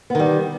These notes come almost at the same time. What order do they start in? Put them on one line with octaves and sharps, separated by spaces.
B3 D#3 G3